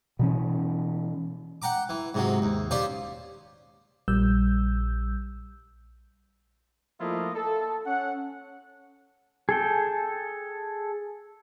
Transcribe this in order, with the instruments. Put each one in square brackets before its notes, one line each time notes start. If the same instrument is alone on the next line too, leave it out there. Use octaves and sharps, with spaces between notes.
[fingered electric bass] B2 E3 C#4
[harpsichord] F#5 G5 A#5 D6
E3
G#2 C3 F#3
D#2
C#4 F4 G4 C5 D5
[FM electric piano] A#1 G3 E6 G6
[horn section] F3 A3 A#3 E4 F4 D#5
A4
C#4 F#5
[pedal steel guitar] G#4 A4 G5